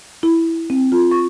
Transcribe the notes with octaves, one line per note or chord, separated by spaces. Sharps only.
E4
C4
F4
C#6